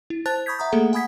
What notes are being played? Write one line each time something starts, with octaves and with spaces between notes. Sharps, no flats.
E4
C5 A5 F#6 A6
B5 C#6 D#6 G6 G#6 B6
E5 F#5 A#5 D#6
A3 A#3 G#4 A4 F#5
F#5 G#5 B5 D#6 G#6 B6